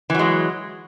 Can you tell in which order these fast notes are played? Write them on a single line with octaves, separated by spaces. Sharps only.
E3 F#3 G#3